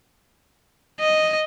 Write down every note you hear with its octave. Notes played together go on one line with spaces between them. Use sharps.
D#5